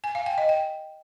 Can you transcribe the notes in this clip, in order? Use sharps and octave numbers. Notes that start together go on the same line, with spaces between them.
G#5
F5
G5
D#5
G5